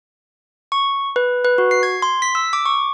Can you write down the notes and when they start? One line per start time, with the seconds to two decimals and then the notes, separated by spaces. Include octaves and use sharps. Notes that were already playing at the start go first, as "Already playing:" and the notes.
0.72 C#6
1.16 B4
1.45 B4
1.58 F#4
1.71 C7
1.83 G#6
2.02 C6
2.22 B6
2.35 E6
2.53 D6
2.66 C#6